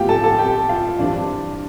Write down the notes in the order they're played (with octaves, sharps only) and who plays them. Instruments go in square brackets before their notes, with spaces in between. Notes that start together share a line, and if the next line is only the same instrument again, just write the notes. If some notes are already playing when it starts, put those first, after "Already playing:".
Already playing: [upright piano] A2 F3 B3 F4 G4 F5 G5
A4 A5
A4 A5
G4 G5
F4 F5
G2 E3 G3 C4 D4 D5